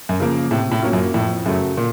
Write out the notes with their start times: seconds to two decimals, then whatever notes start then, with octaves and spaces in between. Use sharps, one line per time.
0.09 F#2
0.20 C#3 F3 A#3
0.51 A2 C3
0.71 A2
0.82 F#3 A#3 C#4 F4
0.93 F#2
1.14 F2 A2
1.45 F#2 C#3 F#3 A3
1.77 A#2